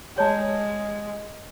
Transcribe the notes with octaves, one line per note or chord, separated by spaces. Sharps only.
G#3 C#5 A5 A#5